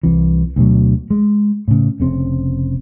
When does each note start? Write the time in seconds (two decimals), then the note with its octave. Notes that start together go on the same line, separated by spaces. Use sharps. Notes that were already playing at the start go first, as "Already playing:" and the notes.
0.03 C2 C3 E3
0.56 D2 B2 F#3
1.10 G#3
1.68 A2 C#3
2.00 F1 C#3 C4